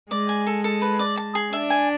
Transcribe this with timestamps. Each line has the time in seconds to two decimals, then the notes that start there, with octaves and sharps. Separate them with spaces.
0.11 G#3 D5
0.29 G#5
0.47 A4
0.64 A4
0.82 B4
0.99 D5
1.17 A5
1.35 G#4
1.53 D4 E5
1.70 G#5